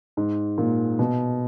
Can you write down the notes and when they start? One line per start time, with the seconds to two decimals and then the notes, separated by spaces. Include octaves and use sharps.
0.17 G#2
0.58 A#2
0.99 B2